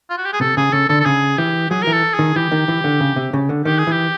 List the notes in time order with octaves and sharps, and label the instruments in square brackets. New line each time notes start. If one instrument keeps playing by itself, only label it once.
[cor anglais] F4
F#4
G4
G#4
[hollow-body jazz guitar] C3 [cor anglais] A4
[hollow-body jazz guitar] C#3 [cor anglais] G#4
[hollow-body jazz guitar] C#3 [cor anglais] A4
[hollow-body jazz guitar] D3 [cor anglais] A4
[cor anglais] A4
[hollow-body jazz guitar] C#3 [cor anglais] G#4
[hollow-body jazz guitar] E3 [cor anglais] G4
[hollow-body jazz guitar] F#3 [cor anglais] G#4
[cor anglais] A#4
[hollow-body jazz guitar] E3
[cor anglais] A4
[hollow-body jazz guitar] D#3 [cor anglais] G#4
[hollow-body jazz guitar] E3 [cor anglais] G4
[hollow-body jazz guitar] D#3
E3
D3
C#3
C3
C#3
D3
[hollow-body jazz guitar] D#3 [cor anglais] G4
[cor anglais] G#4
[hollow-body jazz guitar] E3 [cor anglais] G4